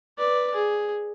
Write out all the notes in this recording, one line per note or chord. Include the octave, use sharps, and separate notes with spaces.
B4 D5
G#4